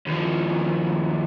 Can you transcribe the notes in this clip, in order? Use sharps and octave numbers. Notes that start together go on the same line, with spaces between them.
D#2 F3